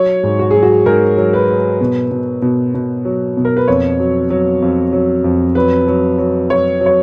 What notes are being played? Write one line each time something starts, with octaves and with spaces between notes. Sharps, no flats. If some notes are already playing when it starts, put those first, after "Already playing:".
Already playing: F#3 C#5
G#2
F#4
F#3 G#4
F#4
G#2 A#4
F#3
B4
F#3
B2
B2
B2
B2
F#3
B2
A#4
B4
F2 C#5
F#3
F#3
F2
F#3
F2
F#3 B4
F#3
F#3
F#3 C#5
F#3
C#5